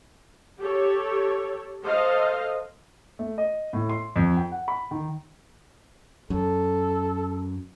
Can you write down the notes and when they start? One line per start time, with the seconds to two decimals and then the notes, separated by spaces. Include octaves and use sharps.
0.60 G4 A4 C#5
1.86 A4 C5 D#5 F5
3.19 A3
3.38 D#5
3.73 A2
3.89 C6
4.16 F2
4.37 G5
4.52 F#5
4.68 B5
4.91 D#3
6.30 F#2 A4